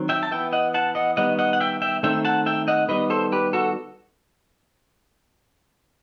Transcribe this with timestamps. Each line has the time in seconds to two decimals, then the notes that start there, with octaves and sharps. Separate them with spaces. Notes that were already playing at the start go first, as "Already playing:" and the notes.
Already playing: D#3 F#3 C4
0.09 E5 G5
0.23 A5
0.31 E3 B3 E5 G5
0.53 D#5 F#5
0.74 F#5 A5
0.95 D#5 F#5
1.17 D#3 G3 B3 D#5 F#5
1.39 D#5 F#5
1.53 F#5
1.60 E5 G5
1.82 E5 G5
2.03 D#3 A3 C4 E5 G5
2.25 F#5 A5
2.46 E5 G5
2.68 D#5 F#5
2.88 D#3 G3 B3 B4 D#5
3.10 A4 C5
3.32 G4 B4
3.53 F#4 A4